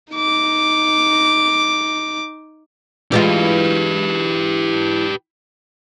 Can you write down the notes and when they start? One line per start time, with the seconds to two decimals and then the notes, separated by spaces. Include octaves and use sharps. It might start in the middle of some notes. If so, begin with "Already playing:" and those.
0.13 D#4 D6
3.12 E3 G#3 F4 G4 B4